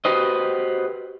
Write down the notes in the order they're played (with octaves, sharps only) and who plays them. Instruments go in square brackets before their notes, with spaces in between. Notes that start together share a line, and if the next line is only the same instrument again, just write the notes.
[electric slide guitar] F#4 G4 B4 C5 D#5